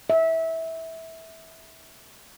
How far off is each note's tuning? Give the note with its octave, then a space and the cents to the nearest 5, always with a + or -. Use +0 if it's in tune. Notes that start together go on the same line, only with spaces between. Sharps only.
E5 -20